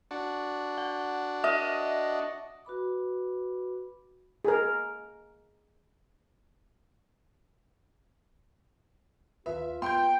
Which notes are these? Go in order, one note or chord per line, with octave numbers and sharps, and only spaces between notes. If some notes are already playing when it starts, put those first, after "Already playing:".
D4 F#4
F#5
D#5 E5
F#4 B4 B5 D6
G#4 A#4
D#2 F4 B4 E5
B3 G5 C6 G6